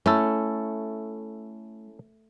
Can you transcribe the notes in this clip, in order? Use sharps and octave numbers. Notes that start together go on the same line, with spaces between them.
A3 C#4 E4 A4